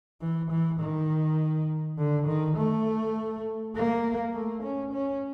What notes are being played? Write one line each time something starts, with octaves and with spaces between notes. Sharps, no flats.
E3
E3
D#3
D3
D#3
A3
A#3
A3
C#4
C#4